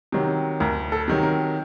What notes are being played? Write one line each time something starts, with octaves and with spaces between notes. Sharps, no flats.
C3 D#3 F#3
D2 A#4
A4
C3 D#3 F#3
A#4